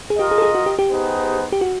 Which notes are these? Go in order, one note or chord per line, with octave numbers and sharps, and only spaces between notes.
G#4
F4 G4 A#4 D#5
G#4
A4
G#4
F#4
G4
G4
B3 D#4 G#4 C5
G4
F#4